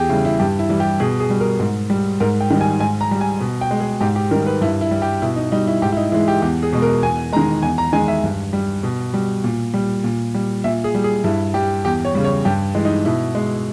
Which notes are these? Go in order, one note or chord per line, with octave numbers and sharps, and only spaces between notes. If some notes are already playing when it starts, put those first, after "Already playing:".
Already playing: E2 G4 G#4
C#3 G3 E4
E4
G2 G4
E4
E3 G3
G4
B2 G#4
G#4
G3
A#4
G#2
G3
G#2 A#4
G5
D#3 G3
G#5
G#2 G#5
A#5
G3
G#5
B2
G5
G#3
G#4
G#2 G4
G4
D#3 G3 A#4
B4
G2 E4
E4
G3
G4
B2 E4
D#4
G3 D#4
E4
G#2 G4
E4
D#4
E3 G#3 E4
G4
E2 G4
G#4
B2 G#3
A#4
E2 G#5
D#3 G#3 A#5
E2 G#5
A#5
D#3 G#3 G#5
E5
G2
G3
B2
G3
A#2
G3
A#2
G3
A#2 E5
G#4
G3
G#4
G2 E4
G3 G4
E2 G4
C#5
C#3 G3
C#5
G2 G4
E3 G#3
D#4
B2 E4
G#3